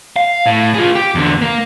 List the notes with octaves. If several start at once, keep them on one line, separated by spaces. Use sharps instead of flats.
F5
A2
F4 G#4
G4
E2 D3
A#3